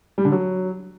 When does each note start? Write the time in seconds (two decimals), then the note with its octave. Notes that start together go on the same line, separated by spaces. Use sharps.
0.18 G3
0.25 D3
0.32 F#3